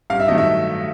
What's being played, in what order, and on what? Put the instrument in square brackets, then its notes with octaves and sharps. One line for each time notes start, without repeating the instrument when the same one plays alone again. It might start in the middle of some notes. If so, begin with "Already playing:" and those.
[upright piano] G2 F5
E5
D#3 F#3 A3 D#5
E5